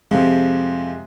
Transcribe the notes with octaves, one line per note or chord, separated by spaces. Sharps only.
F2 C3 F3 G#3